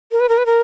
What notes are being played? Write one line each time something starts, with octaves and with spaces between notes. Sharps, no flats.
A#4
B4
A#4
B4
A#4